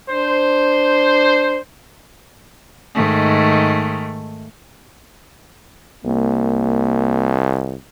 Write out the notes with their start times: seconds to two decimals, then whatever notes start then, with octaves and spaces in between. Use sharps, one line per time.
0.10 D4 C5
2.94 G#2 D#3 A3
6.05 C2 A#3